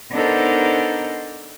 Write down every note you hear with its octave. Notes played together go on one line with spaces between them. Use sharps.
B3 D4 D#4 A4 A#4 C5